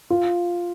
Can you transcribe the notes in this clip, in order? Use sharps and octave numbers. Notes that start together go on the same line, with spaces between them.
F4